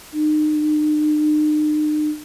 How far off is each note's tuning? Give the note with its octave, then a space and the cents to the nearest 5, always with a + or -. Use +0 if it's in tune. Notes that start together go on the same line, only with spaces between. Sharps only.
D#4 -45